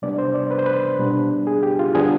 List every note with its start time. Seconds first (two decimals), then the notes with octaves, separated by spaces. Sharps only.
0.02 C3 G3 B3 D4 D5
0.18 C5
0.34 D5
0.51 B4
0.59 C5
0.66 B4
0.99 B2 G3 B3 D4
1.47 G#4
1.63 G4
1.79 F4
1.95 D3 G3 B3 D4 G#4